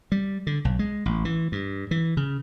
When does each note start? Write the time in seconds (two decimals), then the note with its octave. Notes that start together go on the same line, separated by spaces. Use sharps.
0.12 G3
0.47 D3
0.65 B1
0.79 G#3
1.06 A1
1.25 E3
1.52 G2
1.91 E3
2.17 C#3